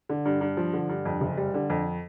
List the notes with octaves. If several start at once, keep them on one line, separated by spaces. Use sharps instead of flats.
D3
G2
G2
F3
D3
G2
F2
F#1
G3
D3
F2